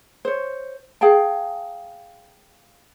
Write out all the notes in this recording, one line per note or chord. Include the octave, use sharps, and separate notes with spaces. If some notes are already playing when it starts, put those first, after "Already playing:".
C5 C#5
G#4 F5 G5 A5